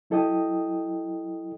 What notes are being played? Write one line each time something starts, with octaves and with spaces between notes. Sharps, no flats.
F#3 E4 A4 D#5 G5 D#6